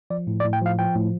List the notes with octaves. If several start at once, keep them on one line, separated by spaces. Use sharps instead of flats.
F3 D5
A2
D5
A2
G5
F3 F5
F3 G5
A2